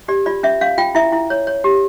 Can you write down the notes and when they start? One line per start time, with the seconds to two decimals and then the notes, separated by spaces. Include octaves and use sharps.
0.08 G4 D5
0.26 F4 D5
0.43 C#4 E5
0.61 C#4 F5
0.78 F4 G5
0.95 E4 E5
1.12 E4
1.30 C#5
1.47 C#5
1.64 G4